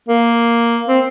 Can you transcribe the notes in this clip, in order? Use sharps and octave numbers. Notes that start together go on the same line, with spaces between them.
A#3
C4